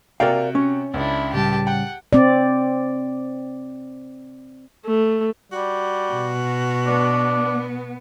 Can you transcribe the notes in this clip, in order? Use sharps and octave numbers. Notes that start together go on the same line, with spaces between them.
C3 F#4 A#4 D5 F5 G5
C#4
C#2 D4 E4
A2 C#3 G3 G4 A5
F#5 G5
C4 D5
A3
G3 F#4
B2
B3 D4